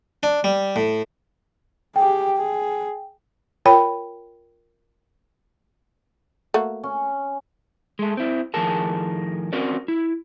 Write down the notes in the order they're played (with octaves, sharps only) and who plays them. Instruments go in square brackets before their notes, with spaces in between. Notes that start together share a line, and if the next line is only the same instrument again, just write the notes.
[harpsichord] D4
G3
A2
[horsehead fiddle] G4 G#4 [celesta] G5
[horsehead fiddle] G#4
[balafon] F4 A#4 C#5 G5 B5
[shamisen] A3 A#3 F#4
[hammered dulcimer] C#4
[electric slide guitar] G#3 A3
C4 E4
A2 D#3 F3 G#4 A#4 A5
C4 C#4 F#4 A#4 D5
E4